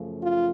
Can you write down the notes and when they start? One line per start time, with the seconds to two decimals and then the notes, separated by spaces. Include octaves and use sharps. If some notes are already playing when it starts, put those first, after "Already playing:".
Already playing: F#2 C#3 F3 A3
0.23 F4